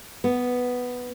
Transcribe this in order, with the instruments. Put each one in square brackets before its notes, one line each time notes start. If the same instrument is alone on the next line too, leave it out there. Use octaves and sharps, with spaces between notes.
[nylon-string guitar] B3